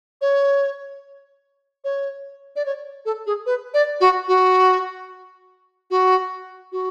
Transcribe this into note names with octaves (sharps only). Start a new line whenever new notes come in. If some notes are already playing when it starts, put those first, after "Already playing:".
C#5
C#5
D5
C#5
A4
G#4
B4
D5
F#4
F#4
F#4
F#4